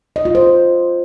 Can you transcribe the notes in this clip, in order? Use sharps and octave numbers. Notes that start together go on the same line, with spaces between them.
D#5
F4
C5